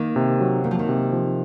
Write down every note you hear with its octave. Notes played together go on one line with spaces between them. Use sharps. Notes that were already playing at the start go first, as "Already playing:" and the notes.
Already playing: D#3 A#3
C3
F#3
D#3 A#3
F3
D#3
C3
F3